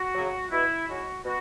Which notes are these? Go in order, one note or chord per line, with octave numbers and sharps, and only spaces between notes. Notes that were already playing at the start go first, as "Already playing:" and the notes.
Already playing: F#4
C#3 F#3
B2 E4
G#3 C#4 E4 F#4
B2 F#4